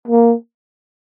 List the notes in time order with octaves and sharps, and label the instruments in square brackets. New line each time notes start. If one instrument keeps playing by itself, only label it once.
[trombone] A#3